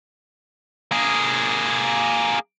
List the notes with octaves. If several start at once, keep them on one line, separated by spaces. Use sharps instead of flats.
A#3 G#4